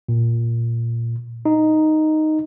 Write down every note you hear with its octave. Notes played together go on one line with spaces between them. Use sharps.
A#2
D#4